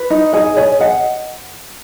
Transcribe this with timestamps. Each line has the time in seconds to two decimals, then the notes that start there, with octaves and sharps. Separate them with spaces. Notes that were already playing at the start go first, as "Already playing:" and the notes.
Already playing: B4
0.10 D#4
0.33 G#4 D#5
0.56 G#4 C#5
0.80 D#5 F#5